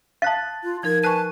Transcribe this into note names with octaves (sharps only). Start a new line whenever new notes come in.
F5 A5 F#6 A6
F4
F3 D#4 A#4 G#6
B4 G#5 A5 C#6 F#6 D#7